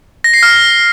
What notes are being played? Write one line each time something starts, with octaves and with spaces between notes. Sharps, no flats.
A#6
C7
F6